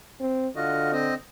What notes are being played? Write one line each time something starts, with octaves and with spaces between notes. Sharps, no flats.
C4
D3 F4 F#4 D#5
C4 D#5